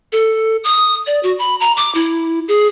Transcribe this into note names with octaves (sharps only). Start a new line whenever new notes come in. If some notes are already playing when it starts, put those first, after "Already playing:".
A4
D#6
D5
F#4
B5
A#5
D6
E4
G#4